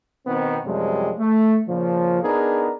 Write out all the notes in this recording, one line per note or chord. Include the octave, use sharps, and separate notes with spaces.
B2 D#3 B3 C4
F#2 C3 F3 G3 G#3
A3
A#2 C#3 F3
B3 D4 D#4 G#4 A#4